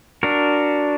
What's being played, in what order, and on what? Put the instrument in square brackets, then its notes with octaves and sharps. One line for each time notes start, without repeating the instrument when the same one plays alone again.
[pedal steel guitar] D4 F#4 A#4